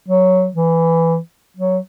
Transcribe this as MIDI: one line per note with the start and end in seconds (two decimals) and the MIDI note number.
0.08 0.48 54
0.54 1.17 52
1.57 1.78 54